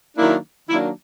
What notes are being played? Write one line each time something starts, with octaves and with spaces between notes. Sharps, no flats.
D#3 F#3 A#3 D4 E4
D#3 F#3 A#3 D4 E4